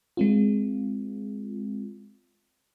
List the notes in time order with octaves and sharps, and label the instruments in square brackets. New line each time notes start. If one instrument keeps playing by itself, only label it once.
[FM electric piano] G#3 C4 F4